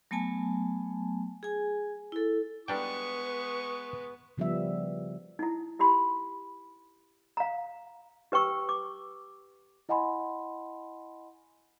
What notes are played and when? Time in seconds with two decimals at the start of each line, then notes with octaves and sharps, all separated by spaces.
0.11 F#3 A3 B3 G#5 A5
1.43 G#4 G#5
2.12 E4 A4
2.68 G3 G#3 B3 D4 B4 G5 C#6
4.38 C#3 F3 G3 B3 E5
5.39 D#4 E4
5.79 E4 G4 B5 C6
7.37 F5 A#5
8.32 G4 B4 G5 C#6 E6
8.69 D6
9.89 E4 D#5 F#5 G#5 B5 C6